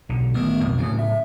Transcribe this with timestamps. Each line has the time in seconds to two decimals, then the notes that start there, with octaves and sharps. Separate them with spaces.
0.09 B1 D3
0.34 A1 D#3 A3 B3
0.62 B1 F2
0.79 A2 C#3 F#3 C#4
0.99 E5